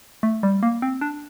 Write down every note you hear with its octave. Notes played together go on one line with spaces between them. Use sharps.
A3
G3
A#3
C4
D4